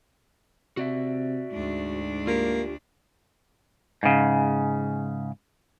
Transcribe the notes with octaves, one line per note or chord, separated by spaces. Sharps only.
C3 F#4 D5 E5
D2 G#2 D4
A#3 F4 G4
G#2 C#3